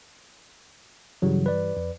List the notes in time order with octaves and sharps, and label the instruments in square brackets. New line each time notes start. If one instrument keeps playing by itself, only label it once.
[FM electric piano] G2 E3 G3 [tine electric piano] C#3 F#3
[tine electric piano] B4 D5
[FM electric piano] F2